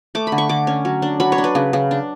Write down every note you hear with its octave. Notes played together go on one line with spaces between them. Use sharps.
A3 D6
B5
D3
C#6
D3 D6
C#4
F#3
D4
F#3 B5
C#5
D4
B4
C#3
C#3
D4